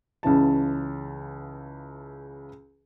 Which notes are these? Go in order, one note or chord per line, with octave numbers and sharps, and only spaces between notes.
C#2 C#3 E3 A5